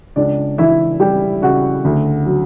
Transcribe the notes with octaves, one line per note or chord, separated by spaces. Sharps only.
C#2 D4 D5
E3 E4 E5
G3 G4 G5
C#3 F#4 F#5
D2
F#3